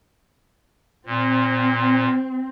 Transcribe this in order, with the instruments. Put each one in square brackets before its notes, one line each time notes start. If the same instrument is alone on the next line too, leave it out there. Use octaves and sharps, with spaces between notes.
[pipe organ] A#2 [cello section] C4